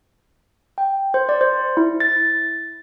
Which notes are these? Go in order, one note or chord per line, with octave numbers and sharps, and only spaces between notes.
G5
C5
D5
C5
E4
A6